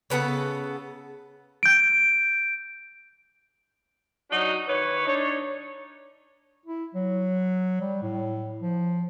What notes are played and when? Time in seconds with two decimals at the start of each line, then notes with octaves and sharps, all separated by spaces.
0.10 C#3 B3 A4 F#5
1.63 G6 D7
4.31 F#3 D4 D#4 F#4
4.68 D#3 E3 B4 C#5
5.06 D4 D#4 C#5
6.66 E4
6.95 F#3
7.81 G3
8.02 A2
8.61 F3